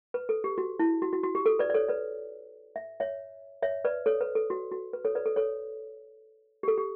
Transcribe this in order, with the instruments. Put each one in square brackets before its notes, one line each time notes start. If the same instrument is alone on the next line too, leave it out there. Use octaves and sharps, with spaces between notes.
[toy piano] B4
A4
G4
F#4
E4
F#4
F#4
F#4
G4
A4
B4 D5
D5
A4 C#5
B4 D5
E5
C#5 E5
C#5 E5
B4 D5
A4 C#5
B4
A4
F#4
F#4
B4
A4 C#5
B4 D5
A4
A4 C#5
G4
A4
G4